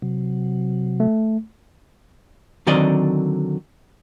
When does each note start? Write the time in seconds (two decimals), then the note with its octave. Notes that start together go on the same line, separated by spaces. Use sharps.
0.02 C3 F#3
1.00 A3
2.67 D3 D#3 F#3 C4 D5 D#5